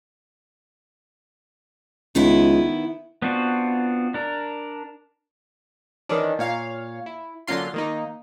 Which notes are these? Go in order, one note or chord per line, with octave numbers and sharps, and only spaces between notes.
C#2 D#3 B3 E4
B3 C4 D4 F4 F#4
D4 A#4
D#3 E3 C#4 D4
A#2 C#5 F5
E4
D3 F#3 A#3 C#4 F4 C6
D#3 A#3 D#4